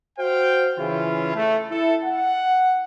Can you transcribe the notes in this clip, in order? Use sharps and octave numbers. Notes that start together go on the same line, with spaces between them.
F#4 C5 F5 G5
C#3 E3 C#4 E4 F4
A3
E4 A4
F#5